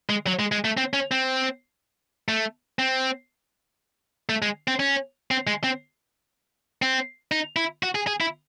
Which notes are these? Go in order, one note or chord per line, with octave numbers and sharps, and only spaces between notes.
G#3
F#3
G#3
G#3
A3
C4
C#4
C4
A3
C4
A3
G#3
C4
C#4
C4
G#3
C4
C4
D#4
E4
F#4
G#4
G#4
E4